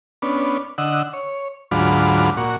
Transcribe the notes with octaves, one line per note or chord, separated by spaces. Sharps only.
B3 C#4 D4
D3 D#5 F#5 E6
C#5
D2 G#2 F#3 F4 B5 D6
A#2 F#4 C#6